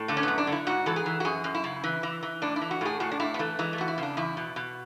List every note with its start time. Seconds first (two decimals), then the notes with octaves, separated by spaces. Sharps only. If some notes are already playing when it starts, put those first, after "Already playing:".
Already playing: A2
0.08 D3 A3
0.17 C#4
0.23 F#2 B3
0.38 D4
0.47 D3
0.52 E4
0.67 G#2 F#4
0.86 E3 A4
0.96 G#4
1.06 E3
1.20 F#4
1.25 F#2 G#4
1.44 F#2
1.55 E4
1.64 C#3
1.84 E3
2.03 E3
2.23 E3
2.42 A2 D4
2.56 E4
2.61 E3
2.71 F#4
2.81 A2 G#4
3.00 A2 F#4
3.12 D4
3.20 A2 E4
3.34 B3
3.39 E3 A3
3.59 E3 G#3
3.73 A3
3.78 E2 F#4
3.88 E4
3.98 C#3
4.03 D4
4.17 E2 E4
4.37 B2
4.56 B2